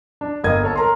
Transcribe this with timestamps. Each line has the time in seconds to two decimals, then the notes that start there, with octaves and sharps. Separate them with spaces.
0.21 D4
0.43 G1 A#3 D#5 G#6
0.63 A4 C#5 A5
0.76 A#4 A#5 C6